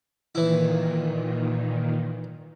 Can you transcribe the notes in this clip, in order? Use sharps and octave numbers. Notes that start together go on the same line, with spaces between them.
A#2 D#3 E3 E4